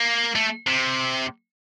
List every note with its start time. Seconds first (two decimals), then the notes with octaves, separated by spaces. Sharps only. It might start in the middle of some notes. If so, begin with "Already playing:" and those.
Already playing: A#3
0.36 A3
0.67 C3